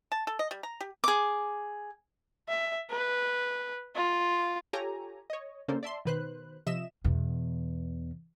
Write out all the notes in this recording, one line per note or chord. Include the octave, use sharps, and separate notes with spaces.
A5
A4
D#5
G3
A#5
G4
G#4 D6
E5
B4
F4
F4 G4 A4 C#5 G#5 A#5
C#5 D#5
C#3 A#3 C#4 D4 A4 C5
D5 E5 A5 C6
B2 D#3 B4 C5 F#6
C3 F3 D#5 E5 E7
E2 B2